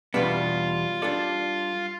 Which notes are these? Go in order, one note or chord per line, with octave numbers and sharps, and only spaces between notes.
E2 B2 G3 B3 D4 F4
G3 D4 A4 D5